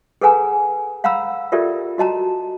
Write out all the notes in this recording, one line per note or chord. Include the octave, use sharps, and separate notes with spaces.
G#4 A4 B4 F#5 G#5 A#5
F5 F#5 A#5 B5 E6
F4 G4 A4 A#4 D5 E5
F#4 D#5 A5 A#5